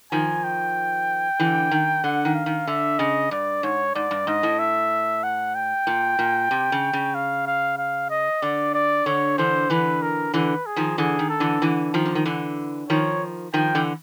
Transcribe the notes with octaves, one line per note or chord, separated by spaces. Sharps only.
D#3 F3 G#5
G5
D3 E3
D#3
D3 F#5
D#3
F5
D#3
D3 E5
C#3 D#5
G2 D5
G#2 C#5
G#2 D5
G2
G#2 D#5
A2
E5
F#5
G5
A#2
A#2
C3
C#3
C#3
F5
F5
F5
D#5
D3 D5
D5
D3 C#5
D3 E3 C5
D3 E3 B4
A#4
D3 E3 B4
G#4
D#3 F3
D3 E3 G#4
D#3
A4
D3 E3
D3 E3
D#3 F3
D3
D#3
D3 E3
D#3 F3 C#5
D#3 F3 G5
D3 E3